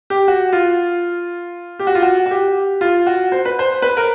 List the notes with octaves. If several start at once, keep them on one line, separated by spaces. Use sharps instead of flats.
G4
F#4
F4
G4
F#4
F4
F#4
F#4
G4
F4
F#4
C5
B4
C5
B4
A#4